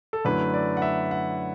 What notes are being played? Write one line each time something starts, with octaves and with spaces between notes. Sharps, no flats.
A4
F#2 D3 A3 E4 B4
D5
F#5
E5
F#5